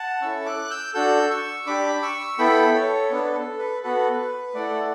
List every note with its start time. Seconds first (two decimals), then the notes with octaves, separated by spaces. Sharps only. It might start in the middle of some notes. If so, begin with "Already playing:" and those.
Already playing: F#5 A5
0.22 C#4 E4 A4 C#6 E6
0.46 D6 F#6
0.71 E6 G6
0.94 D4 F#4 A4 E6 G6
1.30 C#6 E6
1.66 D4 G4 B5 D6
2.02 C#6 E6
2.38 B3 E4 A4 G5 B5
2.74 A4 C#5
3.11 B3 D4 A4 B4
3.35 A4
3.59 B4
3.83 B3 F#4 A4 B4
4.55 A3 E4 A4 D5 F#5